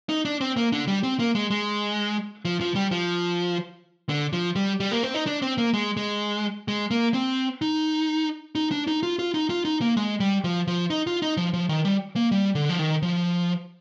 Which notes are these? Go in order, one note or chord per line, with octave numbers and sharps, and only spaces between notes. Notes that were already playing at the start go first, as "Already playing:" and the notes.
D#4
D4
C4
A#3
D3
G3
C4
A#3
G#3
G#3
F3
F3
G3
F3
D3
F3
G3
G3
A#3
C4
D#4
D4
C4
A#3
G#3
G#3
G#3
A#3
C4
D#4
D#4
D4
D#4
F4
F4
D#4
F4
D#4
A#3
G#3
G3
F3
F3
D#4
F4
D#4
F3
F3
D#3
G3
A#3
G3
D3
F3
D#3
F3